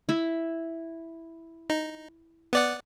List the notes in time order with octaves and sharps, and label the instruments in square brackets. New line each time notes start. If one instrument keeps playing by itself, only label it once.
[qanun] E4 E5
[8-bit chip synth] D#4
B3 D5 F#5